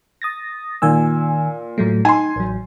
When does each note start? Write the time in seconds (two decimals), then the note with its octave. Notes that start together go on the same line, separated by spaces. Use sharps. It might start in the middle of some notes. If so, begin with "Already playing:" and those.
0.22 D#6 A6 A#6
0.82 A#2 D#3 G#5 E6
1.78 A2 F#3 A3
2.05 D#4 G#5 C6
2.36 A1 F#3